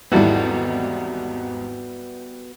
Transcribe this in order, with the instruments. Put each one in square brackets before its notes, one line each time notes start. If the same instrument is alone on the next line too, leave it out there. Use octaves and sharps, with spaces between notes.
[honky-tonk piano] G#1 E2 G#2 [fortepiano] G3 E4 [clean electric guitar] B3 F#4 A4